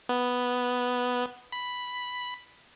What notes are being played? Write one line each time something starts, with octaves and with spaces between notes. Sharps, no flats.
B3
B5